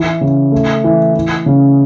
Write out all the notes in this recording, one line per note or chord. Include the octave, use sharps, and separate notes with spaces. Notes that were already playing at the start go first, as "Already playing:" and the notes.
Already playing: E3
C#3
A3
E3
E3
C#3